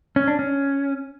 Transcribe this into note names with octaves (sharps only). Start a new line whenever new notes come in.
C#4
D4
C#4